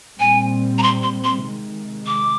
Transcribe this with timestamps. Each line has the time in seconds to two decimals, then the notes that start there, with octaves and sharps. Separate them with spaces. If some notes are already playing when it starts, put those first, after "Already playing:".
0.20 A#2 G3 C4 G#5
0.78 A#5
0.83 C6
1.03 C6
1.24 C6
1.45 C3 D#3 G#3
2.07 D6